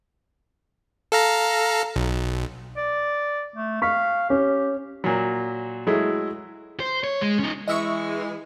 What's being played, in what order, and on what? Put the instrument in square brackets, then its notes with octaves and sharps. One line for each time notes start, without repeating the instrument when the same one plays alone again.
[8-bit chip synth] A4 F5 A#5
B1
[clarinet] D5
A3
[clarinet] F5 [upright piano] C#6 B6
[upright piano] C#4 [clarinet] G4
[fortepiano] A#2 F#3
F#3 G#3 A3 E4 G#4
[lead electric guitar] C5
C#5
G#3
C#4 D#4
[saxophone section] E3 G#3 [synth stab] D#5 E5 C#6